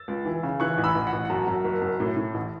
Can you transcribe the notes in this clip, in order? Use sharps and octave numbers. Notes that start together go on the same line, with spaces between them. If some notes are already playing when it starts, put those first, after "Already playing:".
Already playing: E6 A6
C#2
E3
C#3
E3 C#6 F#6
A1 F#6
B5 E6
A1
F#5
A1
F#5
F#2 A5
F#2
F#1
F#2
A2
A2
A1